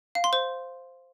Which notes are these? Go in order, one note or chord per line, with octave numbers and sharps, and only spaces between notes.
F5
C6
C5